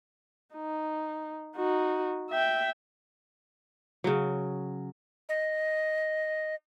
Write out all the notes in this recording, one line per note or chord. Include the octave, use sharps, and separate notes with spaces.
D#4
D#4 F#4
E5 G5
C#3 F#3
D#5